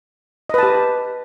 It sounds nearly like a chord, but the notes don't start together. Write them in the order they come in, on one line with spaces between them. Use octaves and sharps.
D#5 B4 A5 G4